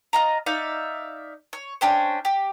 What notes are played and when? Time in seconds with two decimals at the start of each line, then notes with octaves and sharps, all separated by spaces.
0.13 F4 D#5 A#5
0.46 D#4 D5 E5 F5
1.53 C#5
1.81 C#4 D4 G4 C5
2.25 G4